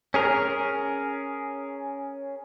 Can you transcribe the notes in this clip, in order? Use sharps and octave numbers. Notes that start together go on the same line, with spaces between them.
C#4 G#4 A#4